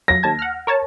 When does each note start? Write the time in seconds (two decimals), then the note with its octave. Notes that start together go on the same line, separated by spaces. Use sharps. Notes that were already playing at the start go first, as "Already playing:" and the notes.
0.08 F#3 A#6
0.23 D#2 A5 G#6
0.39 F#5 F6
0.67 A#4 C#5 A5